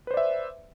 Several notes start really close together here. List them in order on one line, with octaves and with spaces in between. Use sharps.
B4 C5 D5 E5